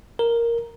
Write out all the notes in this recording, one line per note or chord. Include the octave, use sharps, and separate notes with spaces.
A#4